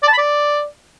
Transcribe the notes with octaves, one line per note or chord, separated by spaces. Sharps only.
D5
A5
B5
D5